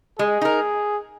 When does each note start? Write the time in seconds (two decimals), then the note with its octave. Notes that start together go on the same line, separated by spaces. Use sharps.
0.18 G#3 G#4
0.41 D#4 A#4